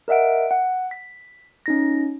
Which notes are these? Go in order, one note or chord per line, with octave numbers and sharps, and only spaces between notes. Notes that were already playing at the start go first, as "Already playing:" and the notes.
A#4 D#5 E5 F#5 D7
F#5
B6
C#4 D#4 A#6